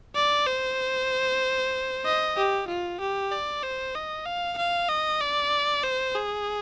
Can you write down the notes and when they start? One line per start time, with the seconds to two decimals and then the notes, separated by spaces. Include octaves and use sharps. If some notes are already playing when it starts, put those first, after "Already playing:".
0.15 D5
0.47 C5
2.05 D#5
2.37 G4
2.68 F4
3.00 G4
3.32 D5
3.63 C5
3.95 D#5
4.26 F5
4.57 F5
4.89 D#5
5.21 D5
5.83 C5
6.15 G#4